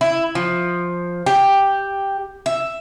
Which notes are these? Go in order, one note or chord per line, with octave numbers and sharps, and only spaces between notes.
E4
F3
G4
E5